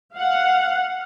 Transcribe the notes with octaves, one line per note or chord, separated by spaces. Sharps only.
F5 F#5